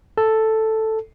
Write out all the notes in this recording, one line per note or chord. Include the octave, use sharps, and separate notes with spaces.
A4